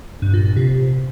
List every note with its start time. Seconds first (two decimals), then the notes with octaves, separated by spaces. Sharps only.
0.22 G2
0.34 A#2
0.45 A#2
0.56 C3